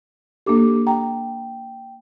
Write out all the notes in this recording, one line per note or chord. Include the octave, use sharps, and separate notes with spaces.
A#3 D4 G4 A4 D6
G5 A#5